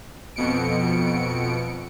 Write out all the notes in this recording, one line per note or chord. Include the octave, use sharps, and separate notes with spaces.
F2 B2 C#7 D7